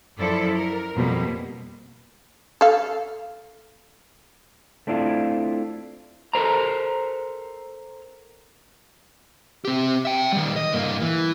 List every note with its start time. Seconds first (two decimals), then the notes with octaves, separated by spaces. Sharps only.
0.18 F#2 F3 E4 A4 D5
0.56 A#4
0.95 F2 B2 G3 A#3
2.61 A4 F5
4.87 A3 C4 D4 E4 F4
6.33 A4 A#4 C5 A#5
9.65 C4 G4
10.05 E5 G5
10.33 D#3 G3
10.56 D#5
10.73 G2 A#3
11.02 E3